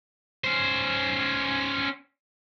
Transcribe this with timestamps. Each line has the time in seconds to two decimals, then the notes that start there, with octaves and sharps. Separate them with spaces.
0.44 C#4 C5